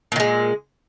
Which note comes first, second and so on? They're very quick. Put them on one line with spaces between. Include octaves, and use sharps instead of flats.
A#2 D#3 G#3